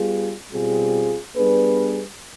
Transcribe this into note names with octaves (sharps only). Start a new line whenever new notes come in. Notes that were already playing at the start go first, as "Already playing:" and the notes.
Already playing: G3 B3 F4 G#4
B2 G3 C4 F4 G#4
G3 B3 D4 G#4 B4